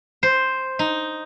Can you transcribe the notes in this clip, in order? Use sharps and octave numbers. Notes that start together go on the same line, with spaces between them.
C5
D#4